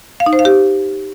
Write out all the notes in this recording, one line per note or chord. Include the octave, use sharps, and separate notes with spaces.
F5
D#4
C5
F5
G4